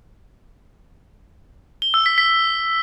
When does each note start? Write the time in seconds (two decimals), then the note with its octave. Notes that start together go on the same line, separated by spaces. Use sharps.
1.82 G7
1.94 E6
2.06 B6
2.18 B6